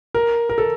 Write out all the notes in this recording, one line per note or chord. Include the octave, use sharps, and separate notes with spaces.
A#4
A#4
A4